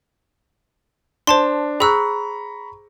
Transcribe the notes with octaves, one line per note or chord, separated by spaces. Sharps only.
D4 C5 A5 C6
G#4 A#5 B5 C#6 E6 F#6